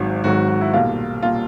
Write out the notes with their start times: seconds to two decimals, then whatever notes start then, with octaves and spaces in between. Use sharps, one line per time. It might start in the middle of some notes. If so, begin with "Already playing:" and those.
Already playing: G#1 G#2 D#3 F#3
0.24 G#1 G#2 D#3 F#3 F#4
0.48 F#4
0.61 E4
0.73 B1 A#2 G3 A#3 F4
1.23 A#2 G3 A#3 F4